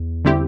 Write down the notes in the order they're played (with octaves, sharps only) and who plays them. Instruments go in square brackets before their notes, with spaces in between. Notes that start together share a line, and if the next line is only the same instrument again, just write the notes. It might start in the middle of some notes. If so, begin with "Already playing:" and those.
Already playing: [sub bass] E2
[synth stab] D3 G3 C4 E4 G4